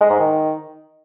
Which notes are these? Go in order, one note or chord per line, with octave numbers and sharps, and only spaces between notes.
G#3
G#2
D#3